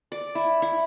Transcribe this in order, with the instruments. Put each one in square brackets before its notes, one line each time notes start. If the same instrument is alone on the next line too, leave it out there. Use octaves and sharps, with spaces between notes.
[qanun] D5
E4
E4